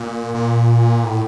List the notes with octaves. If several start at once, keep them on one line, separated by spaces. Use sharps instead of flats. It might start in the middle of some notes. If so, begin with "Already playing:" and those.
Already playing: A#2
A#2
A2